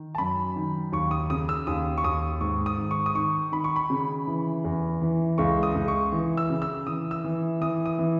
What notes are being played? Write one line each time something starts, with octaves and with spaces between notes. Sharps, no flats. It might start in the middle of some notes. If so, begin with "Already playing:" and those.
Already playing: D#3
A5
F#2 B5
D#3
D#2 C#6
D#6
C#3 D#6
E6
D#2 D#6
C#6
D#2 D#6
G#2 C#6
D#6
D#3
C#6
D#6
D#3 C#6
D#3 B5
C#6
B5
C#3
E3
E2
E3
C#2 C#6
D#6
C#2
C#6
E3
E6
C#3
E6
E3 D#6
E6
E3
E3 D#6
D#6
E3